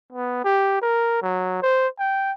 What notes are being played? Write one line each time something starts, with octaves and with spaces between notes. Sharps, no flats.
B3
G4
A#4
F#3
C5
G5